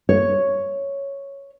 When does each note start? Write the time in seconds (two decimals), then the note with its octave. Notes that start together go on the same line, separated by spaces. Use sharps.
0.09 C#5